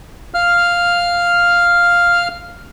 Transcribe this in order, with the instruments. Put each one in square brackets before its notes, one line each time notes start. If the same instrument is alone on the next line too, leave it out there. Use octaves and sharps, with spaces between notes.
[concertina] F5 F6